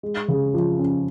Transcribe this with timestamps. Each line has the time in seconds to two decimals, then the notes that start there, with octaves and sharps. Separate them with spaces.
0.03 G#3
0.28 C#3
0.54 F3
0.79 C#4